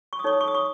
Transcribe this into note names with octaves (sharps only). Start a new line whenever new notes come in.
C#6
D#6
D#4 A4 C#5 C#6
D#6
C#6
D#6
C#6